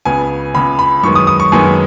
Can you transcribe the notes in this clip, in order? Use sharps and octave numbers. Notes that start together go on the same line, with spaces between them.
C#2 C#3 B3 G#5
C#2 C#3 B3 B5
B5
F#2 D#3 G#3 B3 C#6
D#6
D#6
C#6
F#2 D#3 G#3 B3 G#5